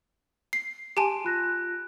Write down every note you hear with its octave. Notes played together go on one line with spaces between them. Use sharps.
C7
G4 G#5 A5 C6 D7
F4 F#6 A#6